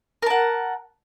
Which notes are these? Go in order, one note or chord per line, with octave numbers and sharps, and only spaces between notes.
A#4 F#5 A5